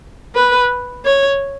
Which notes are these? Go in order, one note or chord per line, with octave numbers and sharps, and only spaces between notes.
B4
C#5